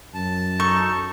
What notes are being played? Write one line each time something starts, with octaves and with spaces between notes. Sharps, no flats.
F#2 A5
D#4 A4 C#6